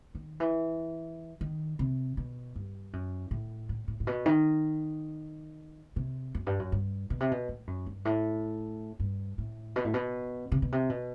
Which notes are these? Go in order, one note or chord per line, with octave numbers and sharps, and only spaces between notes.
D#3
E3
D#3
C3
B2
G2
F#2
A2
A2
A2
A2
B2
D#3
C3
F#2
G2
F#2
G2
B2
C3
B2
A2
F#2
G2
A2
G2
A2
B2
A2
B2
C3
B2
C3
B2